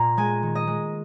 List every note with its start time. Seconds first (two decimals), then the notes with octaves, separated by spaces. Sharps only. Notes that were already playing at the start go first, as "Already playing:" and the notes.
Already playing: A#2 A#3 A#5
0.17 G#3 G#5
0.43 D#3
0.55 D#5
0.67 G#3